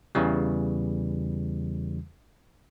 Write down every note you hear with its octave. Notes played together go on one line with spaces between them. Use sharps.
E2 C#3 E3 G3